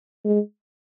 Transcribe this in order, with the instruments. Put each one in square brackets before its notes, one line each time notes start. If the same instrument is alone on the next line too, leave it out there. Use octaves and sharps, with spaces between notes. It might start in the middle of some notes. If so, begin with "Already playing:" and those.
[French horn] G#3